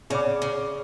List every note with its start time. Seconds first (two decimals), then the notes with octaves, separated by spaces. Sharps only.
0.10 C#3 G#4 D5 F#5 B5 D6
0.42 C#3